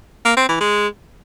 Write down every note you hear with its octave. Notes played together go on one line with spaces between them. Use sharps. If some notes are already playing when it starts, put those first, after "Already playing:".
A#3
C4
E3
G#3